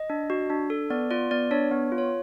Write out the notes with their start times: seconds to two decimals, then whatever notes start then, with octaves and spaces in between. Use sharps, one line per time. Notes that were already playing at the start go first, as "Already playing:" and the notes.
Already playing: D#5
0.10 D4
0.30 F#4
0.50 D4
0.70 A4
0.90 B3 D5
1.11 F4 D5
1.31 B3 D5
1.51 D4 C#5
1.71 B3
1.92 F4
1.98 C#5